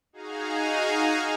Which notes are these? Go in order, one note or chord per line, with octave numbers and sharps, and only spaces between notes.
D#4 F#4 G#4 F5 G#5 A#5